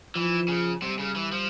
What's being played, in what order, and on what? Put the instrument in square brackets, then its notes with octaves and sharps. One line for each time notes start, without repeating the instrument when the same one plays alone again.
[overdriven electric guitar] E3 [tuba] F3
[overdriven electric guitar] C#3
[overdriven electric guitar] C3 [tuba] G3
[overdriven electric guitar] C#3
E3
F3